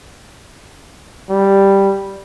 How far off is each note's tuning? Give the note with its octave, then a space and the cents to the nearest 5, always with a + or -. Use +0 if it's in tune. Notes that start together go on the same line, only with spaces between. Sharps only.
G3 +0